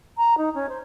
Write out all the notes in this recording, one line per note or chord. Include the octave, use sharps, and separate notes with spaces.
A#5
D#4
C#4
C5